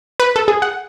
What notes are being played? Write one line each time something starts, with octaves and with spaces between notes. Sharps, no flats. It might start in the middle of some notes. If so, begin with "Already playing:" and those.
B4
A4
G#4
F#5